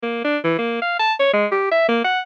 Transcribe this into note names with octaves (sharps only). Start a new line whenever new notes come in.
A#3
D4
E3
A#3
F5
A5
C#5
G#3
G4
E5
A#3
F#5